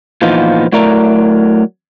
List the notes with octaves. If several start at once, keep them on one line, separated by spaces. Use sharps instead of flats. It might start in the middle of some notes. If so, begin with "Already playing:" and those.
A#2 E3 F3 B3 D#4 F4
F#3 A3 E4 A#4 D5 A#5